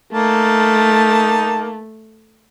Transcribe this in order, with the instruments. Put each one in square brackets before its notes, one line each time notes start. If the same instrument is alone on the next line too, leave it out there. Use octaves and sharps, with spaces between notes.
[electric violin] A3 [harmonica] A#3 D#4 A5